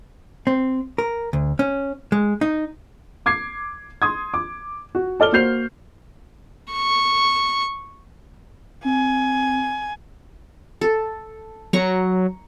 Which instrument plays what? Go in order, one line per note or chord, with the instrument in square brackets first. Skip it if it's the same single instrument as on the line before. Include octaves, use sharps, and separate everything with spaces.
[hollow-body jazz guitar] C4
A#4
D2
C#4
G#3
D#4
[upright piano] D6 G#6 C7
C6 D#6 G#6
D6
F#4
A4 D5 F6 G7
A#3 F#4 C5 G6 C7 F7
[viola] C#6
[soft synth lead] C4 [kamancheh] G#5
[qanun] A4
[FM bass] F#3 [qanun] A#5 C#6